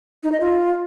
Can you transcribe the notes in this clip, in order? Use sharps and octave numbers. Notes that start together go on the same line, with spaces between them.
D#4
D#5
F4